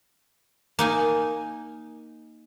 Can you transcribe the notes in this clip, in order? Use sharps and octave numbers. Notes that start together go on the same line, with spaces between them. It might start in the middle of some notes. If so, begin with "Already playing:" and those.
A#3 D#4 G#5